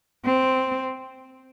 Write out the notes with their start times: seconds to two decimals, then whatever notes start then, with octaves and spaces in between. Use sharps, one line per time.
0.25 C4